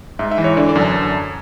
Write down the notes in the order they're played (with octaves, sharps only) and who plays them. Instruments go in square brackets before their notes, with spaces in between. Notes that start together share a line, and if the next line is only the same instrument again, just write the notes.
[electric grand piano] G#2 E5
E5
E3
C#5
D3 D5
D5
F#2
A5